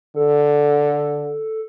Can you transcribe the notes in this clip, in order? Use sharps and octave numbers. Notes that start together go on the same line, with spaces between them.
D3 A4